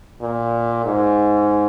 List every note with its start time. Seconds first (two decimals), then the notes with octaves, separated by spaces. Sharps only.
0.22 A#2
0.85 G#2